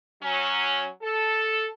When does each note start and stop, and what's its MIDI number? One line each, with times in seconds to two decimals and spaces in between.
0.22 0.87 54
0.22 0.87 61
1.02 1.67 69